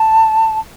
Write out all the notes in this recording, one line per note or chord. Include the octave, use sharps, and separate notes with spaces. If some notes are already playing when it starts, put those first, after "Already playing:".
Already playing: A5